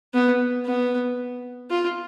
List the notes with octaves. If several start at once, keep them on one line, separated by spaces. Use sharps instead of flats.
B3
B3
F4